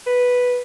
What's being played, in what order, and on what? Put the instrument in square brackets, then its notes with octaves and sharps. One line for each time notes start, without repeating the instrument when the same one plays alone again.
[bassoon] B4